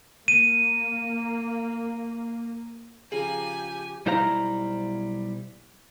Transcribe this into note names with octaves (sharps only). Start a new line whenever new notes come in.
A#3 D#7
C#3 F3 G4 G#4 G#5 A#5
B1 G3 E4 C5 F5 A#5